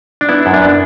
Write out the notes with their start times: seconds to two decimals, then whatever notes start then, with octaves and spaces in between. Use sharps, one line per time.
0.21 D4
0.29 B3 E4
0.46 F#2
0.53 D4
0.62 B3